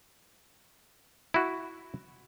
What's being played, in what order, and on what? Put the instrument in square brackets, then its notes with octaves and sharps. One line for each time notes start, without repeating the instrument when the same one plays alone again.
[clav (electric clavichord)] E4 F#4